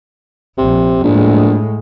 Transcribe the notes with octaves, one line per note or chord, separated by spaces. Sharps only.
A#1 C3
A#1 A2 G#3